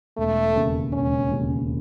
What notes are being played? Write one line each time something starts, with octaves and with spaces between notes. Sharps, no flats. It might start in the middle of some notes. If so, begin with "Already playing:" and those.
E1 A3
D#2 C#3
E1 C#4
D#2 C#3